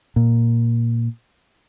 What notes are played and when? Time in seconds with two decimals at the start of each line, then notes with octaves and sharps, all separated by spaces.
0.16 A#2